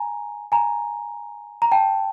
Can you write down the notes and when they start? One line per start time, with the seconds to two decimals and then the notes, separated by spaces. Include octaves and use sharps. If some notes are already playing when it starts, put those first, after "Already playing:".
Already playing: G#5 A#5
0.52 G#5 A#5
1.62 A#5
1.71 G5 A5